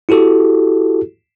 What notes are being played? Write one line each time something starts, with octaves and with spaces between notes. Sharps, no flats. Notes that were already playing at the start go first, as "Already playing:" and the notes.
E4 F#4 G4 A4